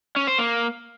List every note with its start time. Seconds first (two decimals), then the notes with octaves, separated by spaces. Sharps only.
0.16 C#4
0.27 C5
0.38 A#3